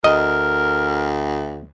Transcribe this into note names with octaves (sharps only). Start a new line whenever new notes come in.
D2 A#4 D#5